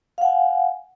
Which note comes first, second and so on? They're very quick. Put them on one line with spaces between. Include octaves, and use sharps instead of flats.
F5 F#5 G#5